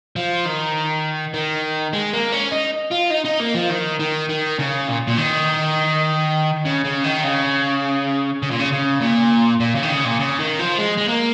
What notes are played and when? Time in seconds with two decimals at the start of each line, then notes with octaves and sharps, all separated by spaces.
0.16 F3
0.45 D#3
1.34 D#3
1.93 G#3
2.13 A#3
2.32 C#4
2.52 D#4
2.92 F4
3.11 D#4
3.25 D#4
3.40 A#3
3.55 F3
3.70 D#3
4.00 D#3
4.29 D#3
4.59 C#3
4.88 A#2
5.07 A#2
5.17 D#3
6.65 C#3
6.85 C#3
7.04 D#3
7.24 C#3
8.42 C#3
8.51 A#2
8.60 C#3
8.72 C#3
9.01 A#2
9.60 A#2
9.75 C#3
9.83 D#3
9.90 C#3
10.05 A#2
10.19 C#3
10.39 D#3
10.59 F3
10.78 G#3
10.97 G#3
11.08 A#3